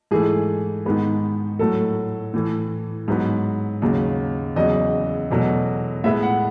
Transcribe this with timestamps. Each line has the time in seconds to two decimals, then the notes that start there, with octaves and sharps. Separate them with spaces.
0.11 G#2 E3 A3 G#4
0.86 G#2 D#3 G#3 B3
1.59 A2 F#3 A3 A4
2.34 A2 E3 A3
3.08 G#2 F#3 B3
3.82 D#2 C#3 F#3
4.56 E2 C#3 F#3 D#5
5.30 E2 B2 F#3 A3
6.04 A2 G#3 B3 E5
6.22 F#5